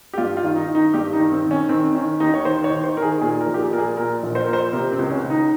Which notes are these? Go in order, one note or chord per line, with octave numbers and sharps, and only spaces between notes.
G4
G2 F4
F4
D#3
D#4
D#3
D#4
G2 G4
D#4
D#3
C4
D#3
C#4
D#3 C4
D#3 C#4
D#2 D#4
C#5
D#3 C5
C#5
D#3
C5
D#3 A#4
G#4
A#2 G#4
A#4
A#1
G4
G#4
A#2 A#4
G#4
A#2 A#4
A#1
C5
A#2 A#4
C5
C3 A#4
C4
C#2
C#4
C#2
D#4